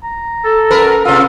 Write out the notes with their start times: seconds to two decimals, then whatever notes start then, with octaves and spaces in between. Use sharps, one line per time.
0.04 A#5
0.45 A4
0.71 F#2 A#4 B4
1.05 C3 B3 F4 E6